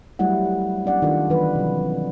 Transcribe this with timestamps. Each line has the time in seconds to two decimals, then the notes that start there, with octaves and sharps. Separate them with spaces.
0.19 F#3 G3 A3 E4 F#5
0.84 B3 C#4 D4 D5 F#5
1.02 D#3 D4 F4 A4
1.30 D#3 E3 G3 B4
1.55 C3 F#3